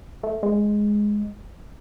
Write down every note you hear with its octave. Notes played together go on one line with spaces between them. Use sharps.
A3
G#3